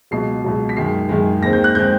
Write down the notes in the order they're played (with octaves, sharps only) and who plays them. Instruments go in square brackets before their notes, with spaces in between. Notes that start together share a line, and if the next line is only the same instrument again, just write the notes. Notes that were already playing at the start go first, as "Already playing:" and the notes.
[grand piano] C#2 B2 F#3 C7
C#2 B2 F#3
B6
F#2 D#3 G#3 C7
F#2 D#3 G#3
D#2 D#3 G#3 C4 A#6
G6
F#6
D#3 G#3 C4 G6